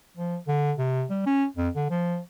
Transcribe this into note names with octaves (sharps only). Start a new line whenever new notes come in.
F3
D3
C3
G3
C#4
F2
D3
F3